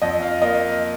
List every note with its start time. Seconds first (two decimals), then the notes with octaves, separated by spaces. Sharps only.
0.02 F2 D#5
0.22 F5
0.42 A#3 D#5